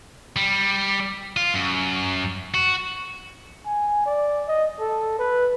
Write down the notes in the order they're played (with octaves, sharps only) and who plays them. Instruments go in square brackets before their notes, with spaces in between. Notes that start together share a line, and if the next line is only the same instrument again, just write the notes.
[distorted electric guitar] G3
F4
F#2
F#4
[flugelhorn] G#5
D5
D#5
A4
B4